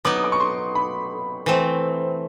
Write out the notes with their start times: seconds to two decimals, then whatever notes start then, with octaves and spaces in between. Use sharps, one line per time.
0.05 F#3 B3 D#4 D6
0.16 D#6
0.24 D6
0.32 C#6
0.40 C6
0.75 B5
1.46 E3 A3 C4